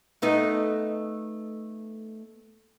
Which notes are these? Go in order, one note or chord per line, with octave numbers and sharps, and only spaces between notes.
A3 B3 D#4